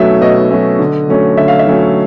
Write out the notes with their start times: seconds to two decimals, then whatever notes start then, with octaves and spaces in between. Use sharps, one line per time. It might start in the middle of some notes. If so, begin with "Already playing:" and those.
Already playing: B2 F#3 A3 C#4 E5
0.21 B2 D#5
0.51 F#3 A3 C#4
0.79 D3
1.08 F#3 A3 C#4
1.37 D3 E5
1.48 F5
1.59 E5
1.67 F#3 A3 C#4